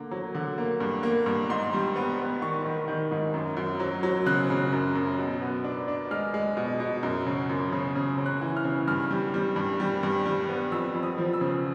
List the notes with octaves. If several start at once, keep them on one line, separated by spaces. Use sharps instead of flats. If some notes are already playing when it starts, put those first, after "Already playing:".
Already playing: D3 A#3
F#3
D3
A#3
G2
A#3
G2
G#2 C6
G3
B3
B3
D#3 C#6
D#3
D#3
G#2
F#2
F#2
F#3
F#3
C#3 F#6
C#3
F#2
F#2
B2
B3
D4
D4
G#3 F6
G#3
B2
B2
F#2
C#3
F#2
C#3
C#3
C#3
F#6
E3
F6
C#3
G2 F6
G3
G3
G2
G3
G2
G3
B3
F2 E6
F2
D#6
F3
E6
C#3